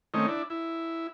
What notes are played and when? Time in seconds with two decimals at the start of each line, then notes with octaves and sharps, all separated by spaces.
0.14 D#3 A3 C4 C#4 D#4
0.28 D4 E4
0.50 E4